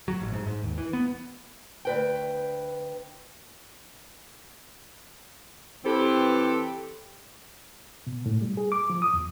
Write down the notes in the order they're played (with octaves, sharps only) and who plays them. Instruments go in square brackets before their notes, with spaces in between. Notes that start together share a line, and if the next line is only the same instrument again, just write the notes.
[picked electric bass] F#3
A1
G#2
G#2
D#2
E3
B3
[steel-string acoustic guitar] D2 B4 G5
[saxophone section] E3 C4 G4 A4 B4 C5
[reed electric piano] B2
A2
G3
G#4
D6
F3
D#6
E2